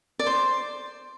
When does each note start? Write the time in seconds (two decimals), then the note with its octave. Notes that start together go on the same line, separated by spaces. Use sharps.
0.19 D5
0.26 C5